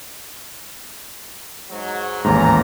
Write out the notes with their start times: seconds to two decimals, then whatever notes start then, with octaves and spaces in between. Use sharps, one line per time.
1.71 G#2 F#3
2.24 A1 D#2 G#2 G#5 A#5